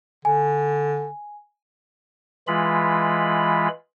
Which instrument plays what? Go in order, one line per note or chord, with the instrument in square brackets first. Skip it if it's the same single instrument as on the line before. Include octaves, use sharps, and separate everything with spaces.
[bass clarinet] D3 [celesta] G#5
[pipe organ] E3 G#3 F4 B5